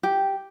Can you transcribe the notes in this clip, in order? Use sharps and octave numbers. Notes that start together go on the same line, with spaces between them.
G4